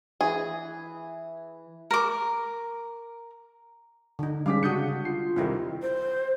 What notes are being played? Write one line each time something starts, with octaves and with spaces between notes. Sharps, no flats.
E3 G#4
A#4 D6
D3 D#4
G3 G#3 C#4 F5 D6 B6
C#3 D4 F#4 D#6 G6 C#7
F4 C7
C2 D#3 C4 E4 G4
C5